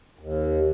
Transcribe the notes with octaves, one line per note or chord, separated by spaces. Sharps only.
D#2